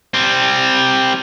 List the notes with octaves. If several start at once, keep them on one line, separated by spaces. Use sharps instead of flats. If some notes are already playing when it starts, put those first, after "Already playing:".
G3 C4